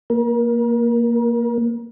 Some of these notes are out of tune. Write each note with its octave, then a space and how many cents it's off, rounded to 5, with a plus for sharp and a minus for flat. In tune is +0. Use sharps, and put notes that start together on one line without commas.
A#3 +0 A#4 +35